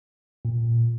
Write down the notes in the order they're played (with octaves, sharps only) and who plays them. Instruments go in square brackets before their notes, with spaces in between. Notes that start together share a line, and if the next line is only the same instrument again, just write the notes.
[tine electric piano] A#2